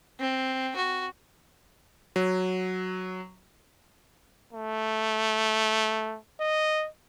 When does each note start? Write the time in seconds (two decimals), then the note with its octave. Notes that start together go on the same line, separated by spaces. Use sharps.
0.19 C4
0.76 F#4
2.16 F#3
4.53 A3
6.40 D#5